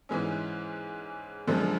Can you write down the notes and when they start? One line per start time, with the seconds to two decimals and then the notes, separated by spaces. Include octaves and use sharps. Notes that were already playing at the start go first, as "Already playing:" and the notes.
0.09 G#2 E3 G#3 C#4
1.47 F#2 D3 F3 G#3